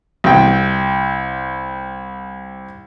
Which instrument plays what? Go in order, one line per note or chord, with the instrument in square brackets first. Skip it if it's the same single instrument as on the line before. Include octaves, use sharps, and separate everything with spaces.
[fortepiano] C2 G5